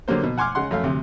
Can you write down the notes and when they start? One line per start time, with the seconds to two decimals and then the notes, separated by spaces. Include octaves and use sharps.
0.08 D3 F#3 G3 A#3 C5
0.23 B2
0.38 F#5 G#5 C6 D6 F6
0.55 C#3 G#3 F#5 C6
0.71 F#2 A3 F5
0.83 D2 C3